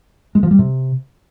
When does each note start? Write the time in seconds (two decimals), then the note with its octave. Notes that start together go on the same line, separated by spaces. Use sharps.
0.35 G#3
0.43 F3
0.51 G3
0.59 C3